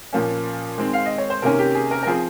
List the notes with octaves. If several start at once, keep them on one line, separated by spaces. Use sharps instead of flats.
A#2 F3 A#3 C#4
D#3 G#3 C4
F5
D#5
C#5
C5
C3 D#3 A#3 C#4 A#4
G4
G#4
A#4
A#4
F3 C4 G#4